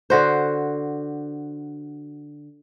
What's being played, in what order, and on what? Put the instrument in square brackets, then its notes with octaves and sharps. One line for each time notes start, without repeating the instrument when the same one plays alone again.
[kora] D3 F#4 C5